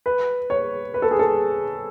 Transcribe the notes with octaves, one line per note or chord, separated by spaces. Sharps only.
B4
C#5
B4
A4
G#4
A4